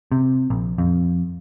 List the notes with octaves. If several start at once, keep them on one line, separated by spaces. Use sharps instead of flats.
C3
A#1
F2